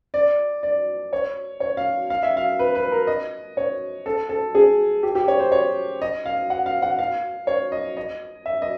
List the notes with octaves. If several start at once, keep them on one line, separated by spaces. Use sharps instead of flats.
D5
D5
C#5
C#5
F5
F5
E5
F5
B4
B4
A#4
D#5
C#5
A4
A4
G#4
G4
G4
C#5
C5
C#5
D#5
F5
F#5
F5
F#5
F5
C#5
D#5
D#5
E5
D#5